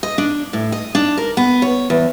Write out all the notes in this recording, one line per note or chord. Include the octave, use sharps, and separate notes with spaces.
D#5
D4
A2
D#5
D4
A#4
B3
C#5
E2